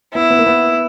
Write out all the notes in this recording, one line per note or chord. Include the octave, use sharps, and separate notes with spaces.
B3 E4
B3
A#3
B3